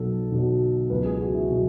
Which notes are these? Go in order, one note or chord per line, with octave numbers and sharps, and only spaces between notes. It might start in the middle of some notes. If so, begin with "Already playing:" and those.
Already playing: B1 B2 F#3 A4
B1 B2 F#3
C#2 B2 F#3 B4
G#4
F#4
E4
B2 F#3